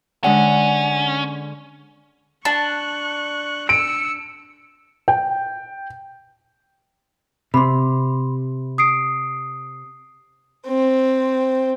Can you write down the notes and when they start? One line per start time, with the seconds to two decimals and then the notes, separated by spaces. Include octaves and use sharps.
0.24 D3 G#3 C#4 F#5
2.45 D4 A5 C#6 F#6
3.69 E6 C#7 D7
5.08 G5
7.54 C3 B5 C6
8.78 D#6 C7 D7
10.67 C4